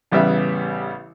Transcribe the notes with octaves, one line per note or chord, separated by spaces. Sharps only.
A1 C#3 G3 B3 E5